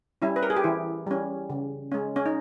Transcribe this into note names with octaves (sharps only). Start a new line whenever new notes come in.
G3 C#4 E4
B4
A#4
G#4
G4
E3 E4
G3 C#4
C#3
G#3 C#4
C#4
D#4